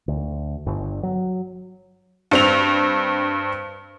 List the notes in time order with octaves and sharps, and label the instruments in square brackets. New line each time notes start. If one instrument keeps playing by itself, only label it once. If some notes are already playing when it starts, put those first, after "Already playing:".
[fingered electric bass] D2
G1
F#3
[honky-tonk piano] G2 C4 F7